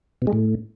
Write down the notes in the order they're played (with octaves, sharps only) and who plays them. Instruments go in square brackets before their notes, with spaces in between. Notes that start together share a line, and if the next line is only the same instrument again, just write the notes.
[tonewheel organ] B2
G#3
A2